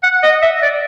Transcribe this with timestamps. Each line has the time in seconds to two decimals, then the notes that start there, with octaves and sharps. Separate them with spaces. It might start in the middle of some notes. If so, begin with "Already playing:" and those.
0.03 F#5
0.23 D#5
0.42 E5
0.62 D5